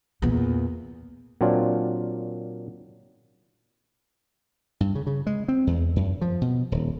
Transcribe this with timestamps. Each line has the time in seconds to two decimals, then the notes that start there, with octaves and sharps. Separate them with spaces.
0.22 E2 A#2
1.41 A#2 F#3 C4 D4 F4
4.80 G2
4.95 C#3
5.07 C#3
5.27 G#3
5.48 C4
5.67 E2
5.96 F#2
6.21 F3
6.41 B2
6.72 D#1